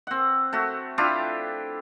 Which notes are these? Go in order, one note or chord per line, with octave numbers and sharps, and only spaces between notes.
C4 F#5
A3 F#4
D4 E4 F4 G4